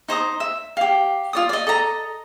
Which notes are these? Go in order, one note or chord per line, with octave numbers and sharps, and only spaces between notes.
D#4 C5 A#5 D#6
E5
G4 F5
F4 D5 D#6
D5 D#5
A4 D#5 A#5